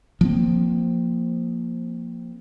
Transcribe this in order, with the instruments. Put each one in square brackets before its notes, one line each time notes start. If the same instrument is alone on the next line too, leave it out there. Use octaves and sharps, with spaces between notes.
[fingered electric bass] F3 A#3 C4